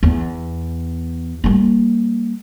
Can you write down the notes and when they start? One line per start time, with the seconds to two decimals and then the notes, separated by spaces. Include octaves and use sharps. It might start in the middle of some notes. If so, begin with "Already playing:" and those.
0.03 E2
1.44 G3 A#3